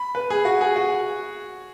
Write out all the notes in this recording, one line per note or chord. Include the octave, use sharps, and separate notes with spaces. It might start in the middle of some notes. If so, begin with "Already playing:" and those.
Already playing: B5
B4
G#4
F#4
G#4
F#4